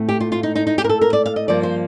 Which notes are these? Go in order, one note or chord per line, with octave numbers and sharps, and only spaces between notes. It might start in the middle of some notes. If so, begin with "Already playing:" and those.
Already playing: A2 A3 C4
G4
F4
F4
D#4
D#4
D#4
G4
A#4
A4
A#4
D5
F5
D#5
G2 F3 A#3 D5
C5